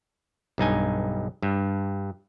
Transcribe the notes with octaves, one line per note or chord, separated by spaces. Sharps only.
B1 G2 D#4 G#5
G2